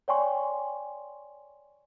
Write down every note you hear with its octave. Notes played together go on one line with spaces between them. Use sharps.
C#5 D5 G5 G#5 C6 C#6